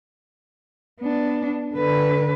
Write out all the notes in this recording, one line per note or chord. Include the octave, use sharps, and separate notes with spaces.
B3 D4
D3 B4